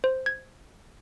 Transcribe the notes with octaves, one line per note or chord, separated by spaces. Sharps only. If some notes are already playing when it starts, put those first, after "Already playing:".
C5
G#6